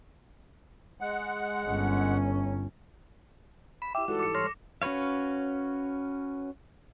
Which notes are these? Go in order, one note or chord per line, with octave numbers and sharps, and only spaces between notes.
G#3 F#5
G1 C#4
B5 E7
E4 G4 E5 D6
G#2 E3 G3 F#4 A4
D6 C#7
C#5 C6 F6 A#6
C#4 F#4 B4 C#5 F5